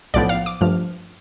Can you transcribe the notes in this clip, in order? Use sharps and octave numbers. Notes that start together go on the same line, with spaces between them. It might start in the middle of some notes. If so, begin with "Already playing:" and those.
B1 A2 F3 B3 D5
F5
D6
G2 F3 A3 F6